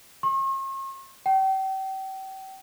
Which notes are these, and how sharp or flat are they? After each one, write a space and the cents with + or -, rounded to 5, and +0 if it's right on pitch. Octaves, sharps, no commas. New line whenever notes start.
C#6 -45
G5 -35